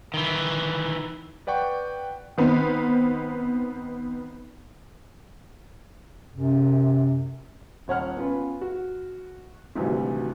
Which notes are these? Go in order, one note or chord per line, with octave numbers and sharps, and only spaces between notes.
D#3 E3
B4 D5 F#5 G5 C#6
D#3 B3 C4
F#2 C3
D#1 C#5 F#5 F6
B3 C#4 F4 B4
F#4
G#1 D2 C3 E3 F#3 G3